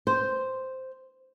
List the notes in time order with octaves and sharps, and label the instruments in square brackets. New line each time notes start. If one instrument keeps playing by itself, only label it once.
[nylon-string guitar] C5